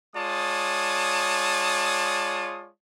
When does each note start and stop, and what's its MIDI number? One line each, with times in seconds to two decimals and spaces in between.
0.15 2.69 56
0.15 2.69 65
0.15 2.69 73
0.15 2.69 74
0.15 2.69 81
0.15 2.69 87